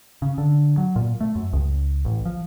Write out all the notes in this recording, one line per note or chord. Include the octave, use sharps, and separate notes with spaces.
C#3
D3
F#3
A#2
A3
F#2
C#2
A1
F3